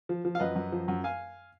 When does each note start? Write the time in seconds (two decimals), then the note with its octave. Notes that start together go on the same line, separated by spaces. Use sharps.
0.09 F3
0.25 F3
0.35 F5
0.40 F#2 B4 D#5
0.56 F#2
0.72 F3
0.88 F#2
1.04 F5 G#5